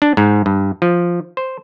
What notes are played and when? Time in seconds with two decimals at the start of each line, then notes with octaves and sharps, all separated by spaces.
0.02 D4
0.17 G#2
0.46 G2
0.82 F3
1.37 C5